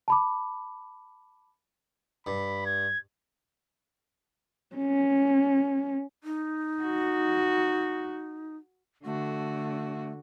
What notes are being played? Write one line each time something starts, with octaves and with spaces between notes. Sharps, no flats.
A5 B5 D6
G2 B5
G#6
C#4
D#4
F#4
D3 A3 F#4